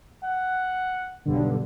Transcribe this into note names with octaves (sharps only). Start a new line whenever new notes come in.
F#5
B1 G2 D3